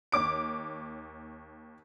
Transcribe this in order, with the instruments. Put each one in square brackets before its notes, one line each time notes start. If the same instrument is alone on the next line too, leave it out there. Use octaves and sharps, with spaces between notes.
[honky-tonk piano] D#2 C#5 D6 D7